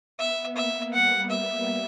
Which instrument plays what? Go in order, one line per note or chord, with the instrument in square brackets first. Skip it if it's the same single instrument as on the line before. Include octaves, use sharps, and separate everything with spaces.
[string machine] B3 [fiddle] E5
[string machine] A#3 [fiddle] E5
[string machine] G3 [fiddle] F#5
[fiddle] E5